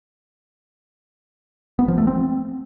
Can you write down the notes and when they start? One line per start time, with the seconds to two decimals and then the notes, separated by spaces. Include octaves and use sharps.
1.79 B3
1.88 F3
1.98 A3
2.07 C4